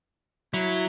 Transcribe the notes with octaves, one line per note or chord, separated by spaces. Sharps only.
F#3 E4